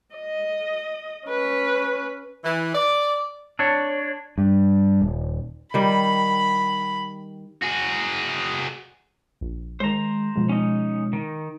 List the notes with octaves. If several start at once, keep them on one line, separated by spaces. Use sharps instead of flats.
D#5
C#4 B4
E3
D5
D4 C#5
G2
D#1
D#3 G3 B5
F#4 G#4
A#1
D#3 G#3 C5 A#5
B2 F3 G#3
C#4 D#4
D#3